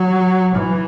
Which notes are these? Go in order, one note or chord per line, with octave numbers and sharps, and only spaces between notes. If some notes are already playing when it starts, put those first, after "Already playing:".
Already playing: F#3
E3